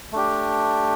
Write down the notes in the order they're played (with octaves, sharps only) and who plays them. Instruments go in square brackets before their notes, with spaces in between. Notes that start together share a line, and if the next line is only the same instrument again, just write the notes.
[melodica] A3 D4 G4